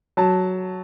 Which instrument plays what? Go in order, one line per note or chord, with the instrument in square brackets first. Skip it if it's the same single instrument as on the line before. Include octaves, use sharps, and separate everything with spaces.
[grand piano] F#3 A5